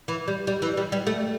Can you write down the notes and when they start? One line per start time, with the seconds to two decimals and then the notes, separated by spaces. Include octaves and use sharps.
0.08 E3
0.28 G3
0.47 G3
0.62 E3
0.77 G3
0.92 G3
1.07 A3